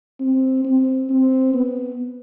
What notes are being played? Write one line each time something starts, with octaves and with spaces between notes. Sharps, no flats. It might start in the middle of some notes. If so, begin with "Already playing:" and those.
C4
C4
C4
B3